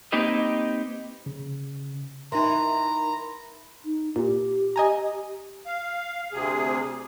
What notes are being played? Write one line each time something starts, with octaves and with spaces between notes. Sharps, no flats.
A#3 C4 D#4 G4 B4 D#5
C#3
E3 D#4 A#4 A#5 C6
D#4
A#2 G4
D#5 G#5 A#5
F5
D2 C3 G#4